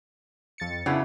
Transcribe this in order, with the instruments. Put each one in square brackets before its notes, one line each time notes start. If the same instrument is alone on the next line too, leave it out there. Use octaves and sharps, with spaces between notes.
[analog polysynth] F2 A6 C#7
[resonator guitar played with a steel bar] C#3 F#3 B3 [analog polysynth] D4 E4